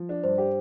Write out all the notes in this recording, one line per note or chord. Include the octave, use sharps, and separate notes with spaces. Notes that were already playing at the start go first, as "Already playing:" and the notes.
Already playing: F3
D4
G2 C5
G4